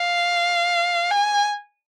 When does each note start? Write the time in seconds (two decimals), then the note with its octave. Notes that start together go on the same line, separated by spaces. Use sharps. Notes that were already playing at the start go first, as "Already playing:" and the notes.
Already playing: F5
1.11 G#5